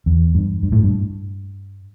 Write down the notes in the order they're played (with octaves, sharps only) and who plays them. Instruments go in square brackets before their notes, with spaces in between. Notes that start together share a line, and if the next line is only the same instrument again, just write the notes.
[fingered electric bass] E2
G2
G2
A2
G2